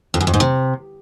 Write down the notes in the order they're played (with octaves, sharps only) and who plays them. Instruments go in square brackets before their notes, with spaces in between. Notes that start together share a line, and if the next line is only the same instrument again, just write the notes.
[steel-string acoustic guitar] F2
F#2
F2
G#2
C3